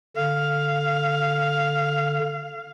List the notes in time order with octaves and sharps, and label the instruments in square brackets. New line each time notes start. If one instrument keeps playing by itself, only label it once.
[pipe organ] D3 [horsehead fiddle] F5